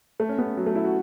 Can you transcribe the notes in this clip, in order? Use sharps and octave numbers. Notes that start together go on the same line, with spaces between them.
A3
C#4
B3
F#3
A3
E4
F#4